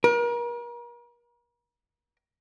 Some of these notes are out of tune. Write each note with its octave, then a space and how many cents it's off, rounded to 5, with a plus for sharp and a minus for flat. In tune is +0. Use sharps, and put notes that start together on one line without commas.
A#4 +40